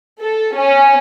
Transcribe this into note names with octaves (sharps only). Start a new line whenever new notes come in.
A4
C#4